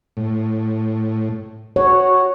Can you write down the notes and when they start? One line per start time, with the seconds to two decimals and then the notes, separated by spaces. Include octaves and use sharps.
0.17 A2
1.76 F#4 C#5